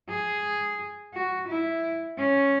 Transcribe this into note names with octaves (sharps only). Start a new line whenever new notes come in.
G#4
F#4
E4
C#4